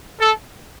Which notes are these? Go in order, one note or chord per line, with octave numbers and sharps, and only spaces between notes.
A4